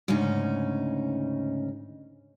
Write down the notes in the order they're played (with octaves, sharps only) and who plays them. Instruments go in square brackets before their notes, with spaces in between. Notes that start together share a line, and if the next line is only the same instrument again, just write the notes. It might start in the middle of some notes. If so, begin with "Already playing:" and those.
[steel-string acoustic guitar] D2 G#2 C#3 C#4 D#4